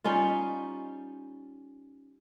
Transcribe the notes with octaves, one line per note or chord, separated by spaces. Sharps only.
G3 C#4 D#4 F4